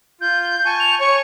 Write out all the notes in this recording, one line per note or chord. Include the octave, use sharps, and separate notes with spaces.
F4 G6
G#5 A5 C#6
F7
C#5 C#6